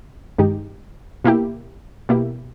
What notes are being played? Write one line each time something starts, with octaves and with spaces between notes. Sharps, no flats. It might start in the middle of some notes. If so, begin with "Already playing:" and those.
G2 D#3 G#3 D#4 G4
B2 A#3 E4 G4
B2 A#3 E4 G4